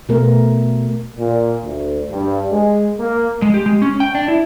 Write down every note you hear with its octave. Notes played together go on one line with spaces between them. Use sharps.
B2 A3 B3 A#4
A#2
D2
G2
G#3
A#3
G#3
G4
G#3
C#4
G5
D4
E4